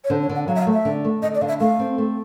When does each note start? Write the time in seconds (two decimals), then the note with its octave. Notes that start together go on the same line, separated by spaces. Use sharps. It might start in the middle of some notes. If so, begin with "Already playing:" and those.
0.04 C#5
0.10 D3 C5
0.22 C#5
0.29 D3
0.35 F#5
0.48 F#3 F5
0.56 E5
0.60 F5
0.67 A3
0.73 E5
0.85 D3
1.05 A3
1.22 D3 D#5
1.35 D5
1.41 D3 F5
1.48 E5
1.60 A3 F5
1.79 C4
1.98 A3